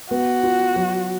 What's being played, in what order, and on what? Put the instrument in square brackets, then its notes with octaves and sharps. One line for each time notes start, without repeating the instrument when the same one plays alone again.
[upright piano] B3 [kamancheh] F#4
[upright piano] F4
F#3